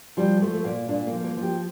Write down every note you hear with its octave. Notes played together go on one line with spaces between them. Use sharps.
F3 G3
F3 A3
A3
A#2 A#3
A#2 D4
A#3
F3
A#3
F3
G4